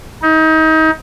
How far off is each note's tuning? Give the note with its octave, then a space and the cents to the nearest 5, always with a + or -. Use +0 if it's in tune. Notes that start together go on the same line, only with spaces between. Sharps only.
D#4 +30